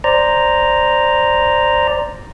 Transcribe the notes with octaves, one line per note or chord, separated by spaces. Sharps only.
C5 D5 A#5